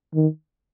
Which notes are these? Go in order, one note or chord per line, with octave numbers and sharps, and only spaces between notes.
D#3